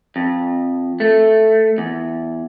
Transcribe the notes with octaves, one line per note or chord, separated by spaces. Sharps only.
F2
A3
E2